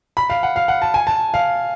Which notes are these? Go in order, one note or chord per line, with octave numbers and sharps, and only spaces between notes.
B5
F5
F#5
F5
F#5
A5
G#5
A5
F5